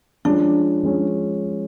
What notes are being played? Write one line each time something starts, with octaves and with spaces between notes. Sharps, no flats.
F3 G#3 C#4 D4
F3 G#3 C#4